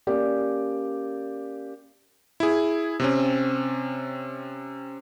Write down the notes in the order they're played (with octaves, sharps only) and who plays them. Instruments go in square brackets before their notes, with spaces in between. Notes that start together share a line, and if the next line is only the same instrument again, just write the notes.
[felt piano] A#3 C#4 G4 D5
[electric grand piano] E4 G#4
C3 C4 C#4